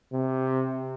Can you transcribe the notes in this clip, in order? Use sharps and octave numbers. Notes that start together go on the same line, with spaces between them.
C3